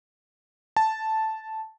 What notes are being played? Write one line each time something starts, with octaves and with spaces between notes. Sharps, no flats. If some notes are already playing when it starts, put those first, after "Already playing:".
A5